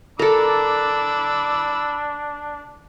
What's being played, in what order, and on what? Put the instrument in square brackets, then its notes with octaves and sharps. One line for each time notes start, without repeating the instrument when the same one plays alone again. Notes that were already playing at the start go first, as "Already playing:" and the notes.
[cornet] D4 [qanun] A4 A#4 [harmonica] B5 D6 E6